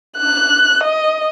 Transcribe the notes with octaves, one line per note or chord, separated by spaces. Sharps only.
F#6
D#5